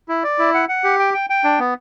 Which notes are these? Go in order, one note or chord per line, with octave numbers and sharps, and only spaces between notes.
E4
D5
E4
F#5
F#5
G4
G5
G5
G5
D4
B3